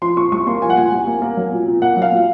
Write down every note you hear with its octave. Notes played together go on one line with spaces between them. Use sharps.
F3 C6
A#2 C#6
C2 C#6
A#3 C6
F3 G#5
F#5
A#2 G#5
C2
A#3
A#3
F#3
A#2
A#2
A#3 F#5
F#3
F5
A#2